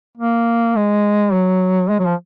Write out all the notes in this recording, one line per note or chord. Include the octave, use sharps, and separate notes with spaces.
A#3
G#3
F#3
G#3
F#3
F3